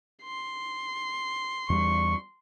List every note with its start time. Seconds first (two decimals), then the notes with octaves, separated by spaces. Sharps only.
0.24 C6
1.70 E2 G3 C#6